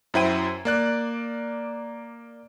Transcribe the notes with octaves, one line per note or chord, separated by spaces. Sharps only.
F#2 F#3 E4 C5 G5 D#7
A#3 D5 F#6